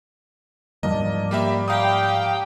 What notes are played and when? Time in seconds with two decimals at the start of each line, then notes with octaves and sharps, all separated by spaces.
0.83 G#2 F3 G3 A#3 D4 D#5
1.31 A#3 G4 D5 E5 B5
1.68 G4 F5 G5 A#5 D#6